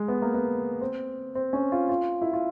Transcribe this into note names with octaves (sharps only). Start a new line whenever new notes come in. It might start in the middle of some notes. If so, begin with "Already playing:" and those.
Already playing: G#3
B3
A#3
B3
C4
C4
C#4
F4
F4
E4
F4